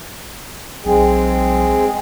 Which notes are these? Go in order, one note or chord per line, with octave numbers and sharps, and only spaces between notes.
B1 G#3 C4 G#4